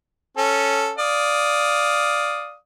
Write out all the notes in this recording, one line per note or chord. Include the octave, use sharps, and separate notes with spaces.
C#4 A4
D5 F5 D#6